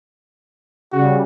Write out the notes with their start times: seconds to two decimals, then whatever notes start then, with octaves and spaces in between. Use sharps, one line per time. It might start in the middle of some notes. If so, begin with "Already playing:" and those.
0.92 C#3 G3 F#4